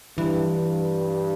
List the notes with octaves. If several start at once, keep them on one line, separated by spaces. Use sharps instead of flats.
G2 E3